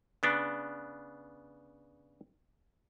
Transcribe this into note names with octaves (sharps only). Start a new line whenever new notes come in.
C#3 B3 D4